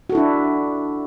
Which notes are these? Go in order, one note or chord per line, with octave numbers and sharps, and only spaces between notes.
D4 E4 F#4 A4